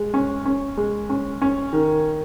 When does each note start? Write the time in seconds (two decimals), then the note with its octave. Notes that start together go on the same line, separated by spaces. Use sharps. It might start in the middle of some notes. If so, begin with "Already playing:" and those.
Already playing: G#3
0.14 C#4
0.45 C#4
0.77 G#3
1.10 C#4
1.42 C#4
1.73 D#3